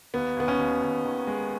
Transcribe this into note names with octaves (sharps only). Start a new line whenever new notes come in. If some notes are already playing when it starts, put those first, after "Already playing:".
D#2 B3
D#2 B3
C#4
D#2
D#2
D#3
G#3